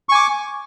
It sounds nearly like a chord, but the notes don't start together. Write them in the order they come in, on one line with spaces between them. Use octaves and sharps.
C#6 G#5 D6